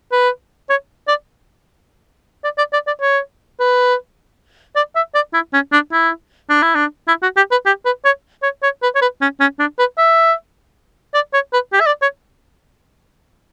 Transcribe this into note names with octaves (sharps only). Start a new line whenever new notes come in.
B4
C#5
D5
D5
D5
D5
D5
C#5
B4
D5
E5
D5
E4
C#4
D4
E4
D4
E4
D4
E4
F#4
G4
B4
G4
B4
C#5
C#5
C#5
B4
C#5
B4
C#4
C#4
D4
B4
E5
D5
C#5
B4
G4
E5
D5
C#5